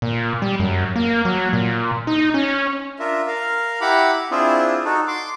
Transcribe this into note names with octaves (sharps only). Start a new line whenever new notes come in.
A#2
G3
F#2
A#3
F#3
A#2
D#4
C#4
D4 F4 A#4 E5
A#4 F5
E4 G4 F#5 A#5 B5 D6
C4 D4 E4 F4 G#4
D#4 F#4 A4
C6 D6